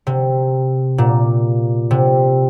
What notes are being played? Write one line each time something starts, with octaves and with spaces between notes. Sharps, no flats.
C3
A#2
C3